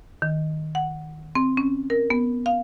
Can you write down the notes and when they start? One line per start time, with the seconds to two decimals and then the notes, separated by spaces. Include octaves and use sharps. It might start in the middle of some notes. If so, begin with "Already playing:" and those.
0.22 D#3
0.75 F#5
1.35 C4
1.57 C#4
1.90 A#4
2.10 B3
2.46 F5